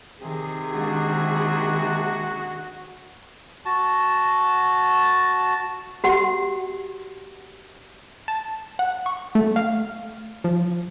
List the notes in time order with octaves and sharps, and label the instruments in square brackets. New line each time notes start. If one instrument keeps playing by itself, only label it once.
[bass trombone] C3 [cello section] D#3 G#4
[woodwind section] G#3 A#3 D4 [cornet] F#4
[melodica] F#4 A5
[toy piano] F#4 G4 F#5
[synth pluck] A5
F#5
C#6
A3
F5
F3